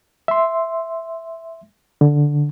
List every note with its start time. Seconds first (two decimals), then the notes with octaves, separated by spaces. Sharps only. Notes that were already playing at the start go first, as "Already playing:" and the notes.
0.28 E5 C6
2.01 D3